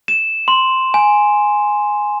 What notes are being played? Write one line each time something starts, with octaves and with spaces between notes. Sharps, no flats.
E7
C6
G#5